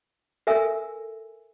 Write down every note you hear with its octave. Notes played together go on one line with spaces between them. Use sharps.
A4 A#4 E5 G#5 E6